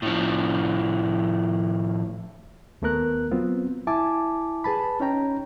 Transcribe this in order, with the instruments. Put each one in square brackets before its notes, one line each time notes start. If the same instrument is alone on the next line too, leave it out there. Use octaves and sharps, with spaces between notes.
[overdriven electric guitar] A2 F3
[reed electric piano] D#2 A3 B3 A#4 F#6
F#3 B3 C4 F4
E4 E5 G#5 A5 D6
G#4 B4 A5 B5
C#4 D#4 C#5 G5 A#5